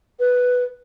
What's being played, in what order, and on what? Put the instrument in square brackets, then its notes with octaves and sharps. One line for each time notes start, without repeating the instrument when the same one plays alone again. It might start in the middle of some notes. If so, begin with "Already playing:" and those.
[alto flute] B4